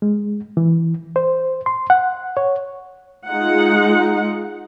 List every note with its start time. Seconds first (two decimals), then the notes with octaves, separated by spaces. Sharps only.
0.02 G#3
0.57 E3
1.16 C5
1.66 C6
1.90 F#5
2.37 C#5
3.28 G#3 D#4 F4 F#5